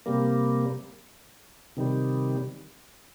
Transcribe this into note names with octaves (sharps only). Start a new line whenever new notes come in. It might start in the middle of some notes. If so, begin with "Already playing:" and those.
C3 G3 A#3
C3 D#3 G3